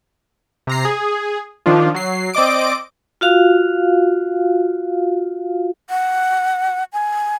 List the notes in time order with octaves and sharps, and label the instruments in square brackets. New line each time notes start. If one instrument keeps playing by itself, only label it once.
[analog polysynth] C3 A#5 C7
G#4
D#3 F3 D4 F4
F#3 C7
C4 D5 D#5 D6 D7
[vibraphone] F4 F#4 F5
[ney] F#5
G#5